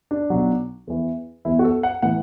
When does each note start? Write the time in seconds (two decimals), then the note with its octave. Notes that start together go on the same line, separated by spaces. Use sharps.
0.11 D4
0.30 B1 B2 F#3
0.87 E2 E3
1.45 E2 E3 E4
1.59 F#4
1.64 A4
1.83 F#5
2.02 A2 E3 F#5